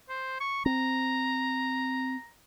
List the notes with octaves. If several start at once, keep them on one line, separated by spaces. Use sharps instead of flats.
C5
C#6
C4 A#5